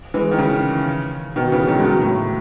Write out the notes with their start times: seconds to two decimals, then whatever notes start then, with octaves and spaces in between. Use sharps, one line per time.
0.14 E3 G#3
0.31 D#3
0.38 C#3 E3
1.36 B2 D#3
1.52 C#3 E3
1.68 D#3 F#3
1.79 G#3
1.85 D#3 F#3
2.01 A2